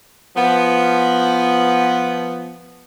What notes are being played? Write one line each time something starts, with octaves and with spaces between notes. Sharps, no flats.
F3 B3